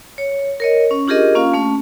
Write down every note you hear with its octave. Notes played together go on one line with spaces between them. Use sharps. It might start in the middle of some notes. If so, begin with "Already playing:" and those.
C#5
A#4 C#5 D#5
C#4
D4 F4 G4 G#4 A#4 D#5
A#3 C#4 F4 F5
A3 C#4